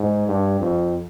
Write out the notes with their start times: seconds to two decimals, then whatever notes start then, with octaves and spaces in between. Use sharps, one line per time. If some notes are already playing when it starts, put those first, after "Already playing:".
Already playing: G#2
0.28 G2
0.59 F2